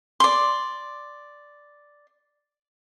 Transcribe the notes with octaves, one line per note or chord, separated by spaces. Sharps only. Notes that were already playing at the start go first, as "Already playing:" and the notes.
D5 C6